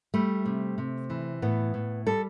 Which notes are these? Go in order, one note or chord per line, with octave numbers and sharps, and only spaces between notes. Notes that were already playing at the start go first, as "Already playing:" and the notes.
G3 A3
C3
C3
E3
A2 B3
A2
G3 A4